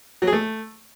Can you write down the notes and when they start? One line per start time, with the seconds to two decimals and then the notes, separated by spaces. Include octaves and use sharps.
0.22 F#3
0.27 G#4
0.32 A3